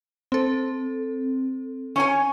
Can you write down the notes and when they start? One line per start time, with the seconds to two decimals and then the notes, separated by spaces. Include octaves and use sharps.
0.32 C4 A4
1.96 C#4 C#5 G#5